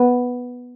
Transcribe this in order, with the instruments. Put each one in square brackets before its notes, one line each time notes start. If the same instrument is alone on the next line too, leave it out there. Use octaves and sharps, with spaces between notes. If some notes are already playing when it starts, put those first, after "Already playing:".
Already playing: [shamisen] B3